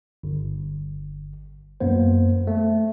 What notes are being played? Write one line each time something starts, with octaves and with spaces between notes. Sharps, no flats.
G1
F#2 A#3 B3 C5
A3